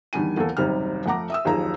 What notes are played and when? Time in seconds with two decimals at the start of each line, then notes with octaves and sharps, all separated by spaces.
0.13 E2 D#3 G3 D4 G#5 D#7
0.36 D#1 E2 A#3 A4
0.57 F#1 D#2 C3 G3 D#4 F6
1.06 F2 A3 F#5 A#5 D6 A#6
1.30 E5 D#6 E6
1.45 F#1 D#2 F3 D#4 G#4 A#5